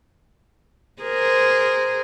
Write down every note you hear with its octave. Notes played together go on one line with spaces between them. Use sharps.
G#4 A#4 C5